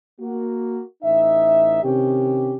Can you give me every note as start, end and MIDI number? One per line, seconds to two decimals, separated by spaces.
0.20 0.81 58
0.20 0.81 66
1.03 1.83 33
1.03 1.83 63
1.03 1.83 76
1.83 2.57 48
1.83 2.57 51
1.83 2.57 61
1.83 2.57 67